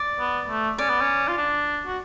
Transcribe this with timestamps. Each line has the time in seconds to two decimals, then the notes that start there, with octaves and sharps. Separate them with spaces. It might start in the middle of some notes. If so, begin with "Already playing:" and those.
Already playing: D5
0.19 B3
0.49 A3
0.78 C#4 D5
0.89 B3
1.01 C#4
1.28 F4
1.38 D4
1.86 F#4